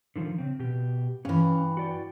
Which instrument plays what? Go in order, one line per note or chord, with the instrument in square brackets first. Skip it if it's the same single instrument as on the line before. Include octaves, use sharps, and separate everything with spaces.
[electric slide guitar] D3 D#3 F3
C#3 C4
B2 G4
[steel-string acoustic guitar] G2 E3 [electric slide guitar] C#4 F5
[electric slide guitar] F#4 D5 G5